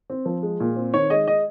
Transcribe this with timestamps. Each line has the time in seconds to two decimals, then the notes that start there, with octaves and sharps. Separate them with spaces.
0.10 C4
0.26 F3
0.43 G#3
0.60 A#2
0.76 C4
0.94 D#3 C#5
1.10 G#3 D#5
1.27 D#5